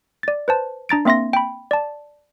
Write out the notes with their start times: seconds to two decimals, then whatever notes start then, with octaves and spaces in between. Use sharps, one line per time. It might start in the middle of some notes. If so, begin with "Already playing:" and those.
0.23 D5 A6
0.48 B4 C5 A5
0.89 D4 A#5 A6 D7
1.05 A#3 C4 E5 C6 A#6
1.33 G5 B5
1.71 D5 A5